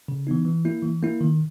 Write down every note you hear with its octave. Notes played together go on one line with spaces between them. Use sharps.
C#3
E3 B3 D#4
E3
A#3 E4
E3
A#3 E4
D#3